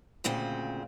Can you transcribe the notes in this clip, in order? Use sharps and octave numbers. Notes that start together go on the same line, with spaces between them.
D2 A#2 C#3 C4